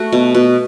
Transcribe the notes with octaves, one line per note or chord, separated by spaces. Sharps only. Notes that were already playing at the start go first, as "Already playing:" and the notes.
Already playing: A3 F#4
B2
B2